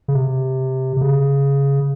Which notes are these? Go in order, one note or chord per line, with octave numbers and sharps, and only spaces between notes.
C#3
C3
C3
C#3